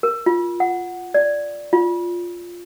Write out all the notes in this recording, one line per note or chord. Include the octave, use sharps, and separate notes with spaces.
A#4
F4
F#5
D5
F4